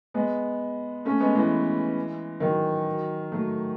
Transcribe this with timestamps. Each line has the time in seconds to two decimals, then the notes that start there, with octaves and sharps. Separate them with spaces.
0.14 G#3 B3
1.05 A3 C#4
1.20 G#3 B3
1.35 E3 G#3
2.40 D#3 F#3
3.32 F#3 A3